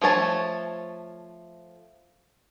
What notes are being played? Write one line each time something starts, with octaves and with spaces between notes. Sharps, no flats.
F3 A3 C#5 A5